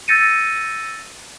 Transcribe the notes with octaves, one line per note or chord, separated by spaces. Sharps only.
E6 G6 A6 A#6 C#7 D#7